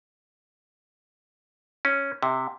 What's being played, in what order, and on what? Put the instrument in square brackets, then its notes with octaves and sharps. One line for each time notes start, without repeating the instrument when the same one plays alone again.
[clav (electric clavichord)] C#4
C3